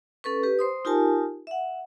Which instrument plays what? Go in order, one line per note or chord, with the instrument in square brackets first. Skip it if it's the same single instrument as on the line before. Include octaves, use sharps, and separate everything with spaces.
[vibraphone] C#4 A4 B4 C#6
G4 B4
C5 C6 D#6
D#4 F4 G4 A#4 G#5 A5
E5 F#5